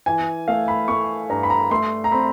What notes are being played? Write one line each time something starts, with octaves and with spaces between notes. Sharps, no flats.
E3 G#5
A3 F5
B5
A3 C#6
G2 A#5
B5
A#5
A3 C6
A#5
C4 B5